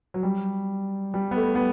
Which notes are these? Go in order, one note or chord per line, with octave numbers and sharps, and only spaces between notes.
F#3
G3
G3
B3
A3
B3